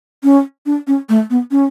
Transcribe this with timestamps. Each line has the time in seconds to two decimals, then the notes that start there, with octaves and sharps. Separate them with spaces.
0.23 C#4
0.66 D4
0.87 C#4
1.09 A3
1.30 B3
1.51 C#4